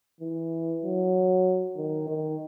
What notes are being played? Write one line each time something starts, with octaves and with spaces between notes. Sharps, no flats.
E3
F#3
D#3
D#3